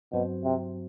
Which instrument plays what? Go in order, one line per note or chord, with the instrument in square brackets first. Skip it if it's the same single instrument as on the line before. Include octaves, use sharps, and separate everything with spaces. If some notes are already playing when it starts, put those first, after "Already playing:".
[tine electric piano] G2 F#3 C4 F#4 C5 [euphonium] B2
[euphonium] C3